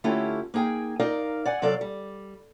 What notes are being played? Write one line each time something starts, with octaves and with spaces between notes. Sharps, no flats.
D3 A3 C#4 E4 F4 G4
A#3 D#4 G#4 G5 G#5
D#4 A#4 D5 D#5 F5
D5 F#5 G#5
C3 F#3 A4 D5 F5
G3